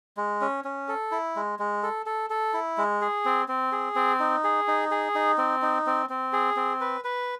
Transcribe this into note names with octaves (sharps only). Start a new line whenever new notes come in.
G#3
C#4
C#4
A4
E4
G#3
G#3
A4
A4
A4
E4
G#3
G#4
C4
C4
G#4
C4
D#4
G#4
D#4
G#4
D#4
C4
D#4
C4
C4
G#4
C4
B4
B4